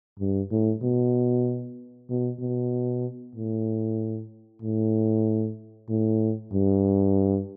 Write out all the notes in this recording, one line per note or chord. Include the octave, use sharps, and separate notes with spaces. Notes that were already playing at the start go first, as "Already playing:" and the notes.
G2
A2
B2
B2
B2
A2
A2
A2
G2